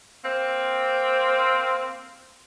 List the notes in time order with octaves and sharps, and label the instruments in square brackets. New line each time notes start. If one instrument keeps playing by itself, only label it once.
[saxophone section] A#3 C4